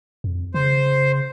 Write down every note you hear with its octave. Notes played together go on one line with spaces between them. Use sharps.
F2
C#3 C5